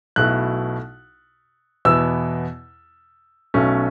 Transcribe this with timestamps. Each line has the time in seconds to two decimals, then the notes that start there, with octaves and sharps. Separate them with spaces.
0.16 B1 B2 A3 E4 F#6
1.85 E2 B2 B3 E4 E6
3.54 B1 B2 A3 C#4